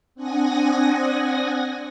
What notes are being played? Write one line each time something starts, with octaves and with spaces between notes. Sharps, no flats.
C4 D4 F#5 G#5 D#6 A#6